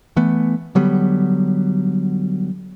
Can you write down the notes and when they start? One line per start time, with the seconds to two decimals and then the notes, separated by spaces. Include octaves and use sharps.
0.16 E3 A3 B3
0.75 D3 F#3 G3 B3